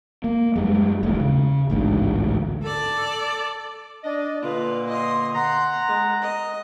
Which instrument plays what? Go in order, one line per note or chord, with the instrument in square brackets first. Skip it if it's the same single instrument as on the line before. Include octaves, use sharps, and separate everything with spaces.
[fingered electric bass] A#3
F#2 G3 G#3
D#1 A1 A2 G#3
C#3
A1 D2 G#2 D3
[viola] A4 D5
[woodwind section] D4 D5 D#5
[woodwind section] A#2 D3 A#3 [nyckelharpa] F4 B4
[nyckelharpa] D#5 C6
[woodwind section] F#5 A#5 [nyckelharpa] C6
[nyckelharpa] G#3
D#5